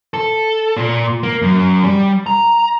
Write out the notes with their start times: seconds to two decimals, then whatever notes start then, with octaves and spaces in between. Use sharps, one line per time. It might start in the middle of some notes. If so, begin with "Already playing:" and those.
0.14 A4
0.77 A#2
1.23 A#3
1.42 F#2
1.84 G3
2.26 A#5